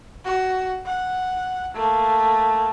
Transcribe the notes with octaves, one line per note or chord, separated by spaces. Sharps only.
F#4
F#5
A3 A#3